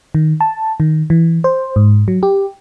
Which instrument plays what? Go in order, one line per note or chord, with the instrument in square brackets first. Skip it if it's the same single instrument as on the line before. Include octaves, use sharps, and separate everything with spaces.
[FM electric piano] D#3
A5
D#3
E3
C5
G#2
F#3
G4